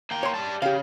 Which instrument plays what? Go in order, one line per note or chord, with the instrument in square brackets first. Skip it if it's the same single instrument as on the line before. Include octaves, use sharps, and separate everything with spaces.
[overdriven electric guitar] A#3 G5
[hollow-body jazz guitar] C#5 C6
[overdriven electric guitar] G3 A5
[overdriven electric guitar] C#3 [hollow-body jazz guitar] G4 F5